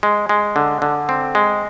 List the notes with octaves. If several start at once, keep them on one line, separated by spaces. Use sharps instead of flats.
G#3
G#3
D3
D3
C4
G#3